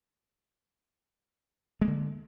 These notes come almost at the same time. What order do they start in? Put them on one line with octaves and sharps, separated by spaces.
G#3 A#3 D3